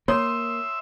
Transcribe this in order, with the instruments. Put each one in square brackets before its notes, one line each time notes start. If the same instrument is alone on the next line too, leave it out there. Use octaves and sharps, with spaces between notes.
[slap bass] A#3 [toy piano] C#5 [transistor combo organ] E5 [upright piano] C6 D#6